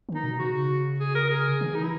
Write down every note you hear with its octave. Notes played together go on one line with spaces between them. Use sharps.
D#3
D#4
B2
C#3 F#4
G#4
A#4
G#4
D#3
E3 D#4
E4